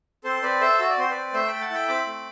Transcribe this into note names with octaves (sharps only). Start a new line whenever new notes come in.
C4 A4 C5
C4 B4 D5
A4 C5 E5
F#4 E5
D5
C4 C5
C4 B4 D5
A3 C5 E5
A4 G5 B5
F#5 A5
E4 G5 B5
C4 B5 D6
A3